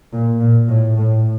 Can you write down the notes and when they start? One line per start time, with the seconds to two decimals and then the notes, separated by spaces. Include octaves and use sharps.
0.13 A#2
0.40 A#2
0.68 A2
0.97 A2